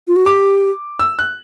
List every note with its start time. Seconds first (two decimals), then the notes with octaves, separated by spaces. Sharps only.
0.08 F4
0.16 F#4
0.26 G4 D6
0.99 E6
1.19 F#6